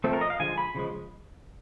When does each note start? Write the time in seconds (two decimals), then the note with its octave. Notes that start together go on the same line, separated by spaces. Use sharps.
0.04 F3 A3 C4 A4
0.13 A#4
0.21 D#5
0.30 F5
0.40 D3 F3 G#3 G#5
0.58 B5
0.75 C#3 F3 G#3